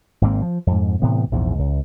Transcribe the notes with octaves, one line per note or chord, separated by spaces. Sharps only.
G#1 G#2 A#3 C4
F3
F2 G#2
A2 C3 E3 B3
A#1 E2 G#2
C#2